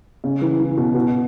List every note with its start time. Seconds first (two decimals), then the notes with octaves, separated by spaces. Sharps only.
0.24 C#3
0.41 E3
0.59 E3
0.77 B2
0.95 B2